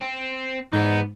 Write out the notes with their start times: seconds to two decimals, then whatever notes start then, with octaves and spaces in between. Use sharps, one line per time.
0.02 C4
0.72 G#2 E3 B3 D#4